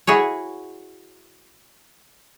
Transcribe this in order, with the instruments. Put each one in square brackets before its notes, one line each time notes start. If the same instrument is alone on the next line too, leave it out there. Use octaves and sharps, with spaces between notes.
[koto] E4 F#4 G#4 C#5